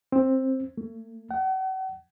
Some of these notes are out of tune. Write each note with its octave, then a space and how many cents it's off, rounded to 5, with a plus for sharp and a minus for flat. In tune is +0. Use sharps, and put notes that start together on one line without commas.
C4 +10
A3 +35
F#5 +40